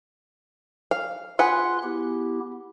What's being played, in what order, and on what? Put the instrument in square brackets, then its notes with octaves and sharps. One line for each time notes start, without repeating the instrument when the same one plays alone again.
[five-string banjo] F5
[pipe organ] F4 C6 F#6 [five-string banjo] G#4 B4 F#5
[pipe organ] B3 E4 G4